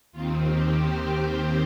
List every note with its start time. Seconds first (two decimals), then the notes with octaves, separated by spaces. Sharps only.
0.12 D#2 D#3 C4 F4
0.46 G4
0.79 C5